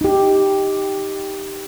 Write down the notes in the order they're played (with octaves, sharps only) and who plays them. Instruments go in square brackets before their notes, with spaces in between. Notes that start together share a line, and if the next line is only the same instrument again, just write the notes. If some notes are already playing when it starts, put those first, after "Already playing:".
[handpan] D#4 G4